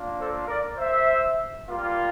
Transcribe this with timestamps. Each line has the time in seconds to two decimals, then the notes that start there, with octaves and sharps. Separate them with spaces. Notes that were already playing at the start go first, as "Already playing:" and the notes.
Already playing: A#3 D4 F4
0.18 A4 C5
0.47 A#4 D5
0.77 C5 E5
1.67 G3 A#3 F4